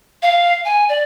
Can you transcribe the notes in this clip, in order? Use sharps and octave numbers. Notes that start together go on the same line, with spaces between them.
F5
G#5
D5